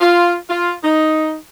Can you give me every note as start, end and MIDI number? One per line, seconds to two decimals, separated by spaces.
0.01 0.36 65
0.50 0.74 65
0.84 1.36 63